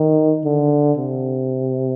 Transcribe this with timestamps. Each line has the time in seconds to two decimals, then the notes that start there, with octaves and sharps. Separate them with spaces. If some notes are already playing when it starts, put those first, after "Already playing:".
Already playing: D#3
0.45 D3
0.97 C3